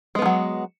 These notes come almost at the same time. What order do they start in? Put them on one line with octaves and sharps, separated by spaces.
G#3 B3 F3 F#3